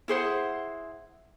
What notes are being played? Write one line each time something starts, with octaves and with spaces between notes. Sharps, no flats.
E4 G#4 C5 F#5